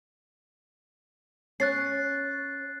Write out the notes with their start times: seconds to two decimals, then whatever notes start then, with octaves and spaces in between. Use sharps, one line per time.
1.60 C#4 F#6 A6 C7